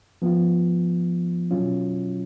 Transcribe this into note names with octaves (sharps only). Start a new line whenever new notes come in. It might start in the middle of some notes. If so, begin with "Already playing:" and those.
F3 B3 F4
B2 F#3 C#4 F4